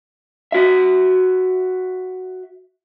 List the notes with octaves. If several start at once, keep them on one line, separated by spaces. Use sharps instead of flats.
F#4 E5